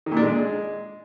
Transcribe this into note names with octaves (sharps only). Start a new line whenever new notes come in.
D#3
A#2
D4
G#3